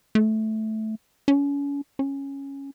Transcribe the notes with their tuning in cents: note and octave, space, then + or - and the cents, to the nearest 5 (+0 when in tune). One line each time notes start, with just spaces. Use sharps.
A3 -10
C#4 +35
C#4 -5